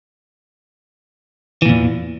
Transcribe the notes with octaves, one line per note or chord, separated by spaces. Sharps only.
E2 A#2 E3